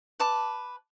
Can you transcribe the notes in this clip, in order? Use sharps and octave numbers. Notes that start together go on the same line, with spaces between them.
B4 A5 D6